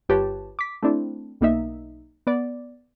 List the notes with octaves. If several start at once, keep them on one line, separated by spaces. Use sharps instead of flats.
G1 F4 G4 B4 C#5 A5
D6 B6
A3 C4 D4 E4
B1 A#3 D#4 E5
B3 D5